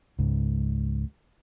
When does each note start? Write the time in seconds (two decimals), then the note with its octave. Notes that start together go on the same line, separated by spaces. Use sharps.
0.19 C#2 G#2